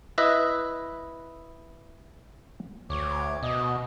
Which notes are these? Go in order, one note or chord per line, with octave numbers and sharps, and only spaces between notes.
E4 B4 D#5 E5
D2 C#5 D6
B2 D#5